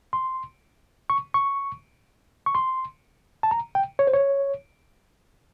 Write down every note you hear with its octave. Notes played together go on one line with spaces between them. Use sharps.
C6
C#6
C#6
C#6
C6
A5
A#5
G5
C#5
C5
C#5